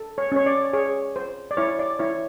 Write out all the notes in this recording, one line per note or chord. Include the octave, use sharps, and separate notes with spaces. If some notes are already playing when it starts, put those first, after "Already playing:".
Already playing: A4
C#5
C#4 C#5
D5
G#4 C#5
C5
D5
E4 C#5
D5
E4 C#5